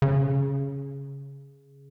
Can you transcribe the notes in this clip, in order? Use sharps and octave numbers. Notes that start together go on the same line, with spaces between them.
C#3